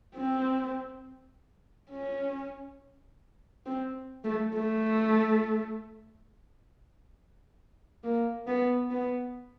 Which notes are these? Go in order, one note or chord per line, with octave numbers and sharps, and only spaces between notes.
C4
C#4
C4
A3
A3
A#3
B3
B3